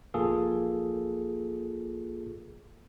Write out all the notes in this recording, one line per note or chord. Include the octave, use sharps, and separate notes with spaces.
A#1 A#3 F4 G#4 A4